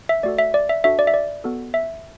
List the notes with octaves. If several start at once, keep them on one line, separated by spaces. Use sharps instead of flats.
E5
A3 F#4 A4 D5
E5
D5
E5
D4 F#4 A4 E5
D5
E5
D5
B3 F#4 A4
E5